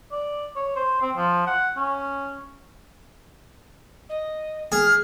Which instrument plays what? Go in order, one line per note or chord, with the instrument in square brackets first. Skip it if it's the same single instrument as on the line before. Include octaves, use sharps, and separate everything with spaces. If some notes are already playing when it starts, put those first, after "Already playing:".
[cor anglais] D5
C#5
C5
C4
F3
F#5
C#4
[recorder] D#5
[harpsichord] G#4 [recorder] F6